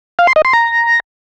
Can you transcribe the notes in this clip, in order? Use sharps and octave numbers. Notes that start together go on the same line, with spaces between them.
F5
C6
D#5
C6
A#5